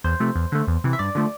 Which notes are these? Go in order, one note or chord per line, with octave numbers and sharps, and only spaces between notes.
E2 C5
C3 F3 A3
E2
D3 A3
E2
C3 E3
E5
G2 D5
D3 F3 A3